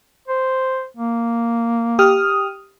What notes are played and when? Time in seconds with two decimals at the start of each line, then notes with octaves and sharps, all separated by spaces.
0.28 C5
0.97 A#3
1.99 G4 D#6 F6